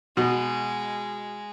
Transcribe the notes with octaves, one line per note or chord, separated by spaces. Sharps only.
B2 G#3